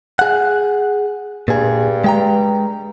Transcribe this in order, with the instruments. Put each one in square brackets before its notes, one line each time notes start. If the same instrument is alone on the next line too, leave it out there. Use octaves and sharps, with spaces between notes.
[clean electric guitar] G#4 F#5
[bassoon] G2 [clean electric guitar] A#2 G#4
[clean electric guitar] G#3 G5 A#5